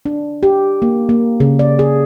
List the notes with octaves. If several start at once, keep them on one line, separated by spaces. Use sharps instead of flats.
D4
G4
A#3
A#3
C#3
D5
G#4